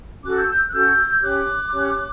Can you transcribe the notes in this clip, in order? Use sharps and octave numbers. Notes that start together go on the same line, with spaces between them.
C#4 F#4 A4 D6 F#6
E6 G6
E6 G6
F#6
C#4 F#4 A4 E6 G6
C#4 G4 C#5 D6 F#6
C#4 G4 C#5